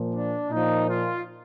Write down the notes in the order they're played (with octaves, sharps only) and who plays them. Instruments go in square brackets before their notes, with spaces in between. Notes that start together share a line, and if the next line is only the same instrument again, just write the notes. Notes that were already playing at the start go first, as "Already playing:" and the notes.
Already playing: [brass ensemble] A#2 F3
D4
A#2 F3 D#4
F4